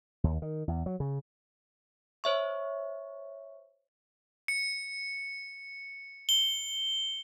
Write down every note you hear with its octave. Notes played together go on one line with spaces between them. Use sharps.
D#2
D#3
E2
F#3
C#3
C5 C#5 E5 C#6
C#7
G7